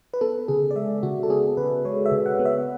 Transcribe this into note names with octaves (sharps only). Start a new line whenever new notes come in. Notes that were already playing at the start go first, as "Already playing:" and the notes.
B4
B3 A4
C#3 G#4
D5
G#3 E5
C#3 F#4
A4
B3 G#4
C#3 B4
G#3 C#5
E5
C#3
F#5
B3
E5